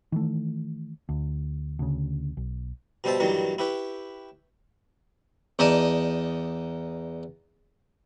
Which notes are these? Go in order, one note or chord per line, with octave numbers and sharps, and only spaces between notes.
D#3 E3 A3
D2
D2 C#3
B1
B2 G3 C5 E5 A5
G2 A#2 D#3 E3 F#3 G3
E4 G4 B4 C#5
E2 D#4 D5 D#5 A5